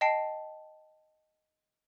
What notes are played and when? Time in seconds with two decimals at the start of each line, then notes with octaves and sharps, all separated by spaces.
0.01 D#5 G5 A5 C7 D7